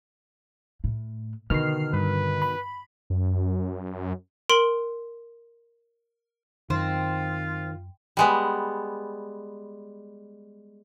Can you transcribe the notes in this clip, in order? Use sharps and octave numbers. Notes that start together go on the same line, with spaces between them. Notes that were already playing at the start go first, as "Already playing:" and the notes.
A2
B2 D3 D#3 F6 C7
G2 B4
B5
F#2
A#4 C6 D7 F#7
F#2 D#3 C4 F4
G3 G#3 B3